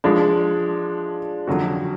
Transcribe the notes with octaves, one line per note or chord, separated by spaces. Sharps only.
F3 G#3 D4
F2 D3 F#3 C#4 F#4